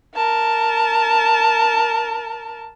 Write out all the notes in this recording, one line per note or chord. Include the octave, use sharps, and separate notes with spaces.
A#4 A5